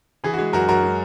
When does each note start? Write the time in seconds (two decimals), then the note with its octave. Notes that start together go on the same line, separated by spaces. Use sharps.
0.24 E3 G#4
0.34 F#4
0.38 G#3
0.53 F#2 F#4 A#4
0.68 F#2 F#4 A#4
0.83 G#3